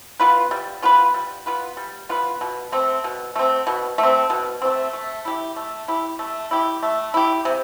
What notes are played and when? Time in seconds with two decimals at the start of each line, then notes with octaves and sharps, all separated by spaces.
0.20 B3 F4 B4
0.51 G3
0.82 B3 F4 B4
1.14 G3
1.46 B3 F4 B4
1.77 G3
2.09 B3 F4 B4
2.41 B2
2.72 A3 C4
3.04 B2
3.36 A3 C4
3.67 B2
3.98 A3
4.03 C4
4.30 B2
4.62 A3 C4
4.93 A3
5.25 E4 G4
5.56 A3
5.88 E4 G4
6.19 A3
6.51 E4 G4
6.83 A3
7.14 E4 G4
7.45 C3